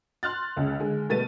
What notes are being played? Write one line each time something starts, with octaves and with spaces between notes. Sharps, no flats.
C6 F6 F#6 A6
C#2 C#3
D3 G#3
B2 G3 A3 B3 A6 D#7